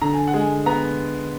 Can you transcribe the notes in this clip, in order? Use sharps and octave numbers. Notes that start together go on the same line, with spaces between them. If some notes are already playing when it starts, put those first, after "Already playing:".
D3 A#5
G#5
F#5
G#3
G#5
B3 A#5